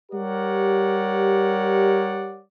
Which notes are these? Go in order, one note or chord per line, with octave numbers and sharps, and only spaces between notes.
G3 G4 A#4 C#5 D5 F#5